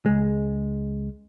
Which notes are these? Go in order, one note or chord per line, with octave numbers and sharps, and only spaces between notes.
C#2 G#3